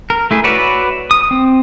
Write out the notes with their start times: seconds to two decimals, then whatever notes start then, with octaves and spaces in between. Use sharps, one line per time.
0.10 A#4
0.31 A3 E4 G#4
0.44 F#4 B4 C#5 D5 E5
1.11 D#6
1.31 C4